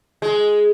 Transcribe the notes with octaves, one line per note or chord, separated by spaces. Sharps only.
G#3